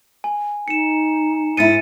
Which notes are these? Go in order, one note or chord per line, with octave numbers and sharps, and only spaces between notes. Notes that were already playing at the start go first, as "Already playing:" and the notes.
G#5
D#4 C#7 E7
G#2 E4 A6 C#7 D#7